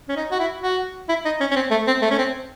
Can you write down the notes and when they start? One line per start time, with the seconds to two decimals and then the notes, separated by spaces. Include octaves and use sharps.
0.09 C#4
0.16 D#4
0.31 F#4
0.39 E4
0.62 F#4
1.09 E4
1.25 D#4
1.40 C#4
1.51 C#4
1.56 C4
1.71 A3
1.87 C4
2.02 A3
2.11 C#4
2.18 C4